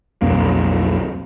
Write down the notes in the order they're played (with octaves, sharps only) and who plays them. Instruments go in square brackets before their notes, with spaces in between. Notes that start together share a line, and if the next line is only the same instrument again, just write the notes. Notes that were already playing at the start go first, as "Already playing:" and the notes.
[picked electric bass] B1 F2 A#3